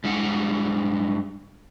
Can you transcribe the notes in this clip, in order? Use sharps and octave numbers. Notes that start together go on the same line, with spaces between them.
G2 G#3 F#5